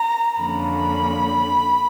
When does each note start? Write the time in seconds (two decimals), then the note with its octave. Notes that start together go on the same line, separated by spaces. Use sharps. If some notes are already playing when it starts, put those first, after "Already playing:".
Already playing: A#5
0.40 F2 D3 F3 A#3 C#4 B5